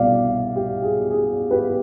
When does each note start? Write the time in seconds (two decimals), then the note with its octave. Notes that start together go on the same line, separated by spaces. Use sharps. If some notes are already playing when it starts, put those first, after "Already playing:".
Already playing: C2 B2 B3 D5 F5
0.56 G4
0.83 G#4
1.10 G#4
1.51 G4 B4